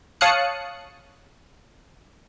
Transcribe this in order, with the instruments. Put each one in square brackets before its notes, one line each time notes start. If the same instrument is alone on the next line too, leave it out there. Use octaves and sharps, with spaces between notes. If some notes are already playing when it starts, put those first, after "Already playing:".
[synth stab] C#5 F5 A5 D#6 F#6 C#7